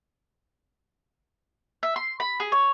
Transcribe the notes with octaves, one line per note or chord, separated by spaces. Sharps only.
E5
C6
B5
G#4
C#5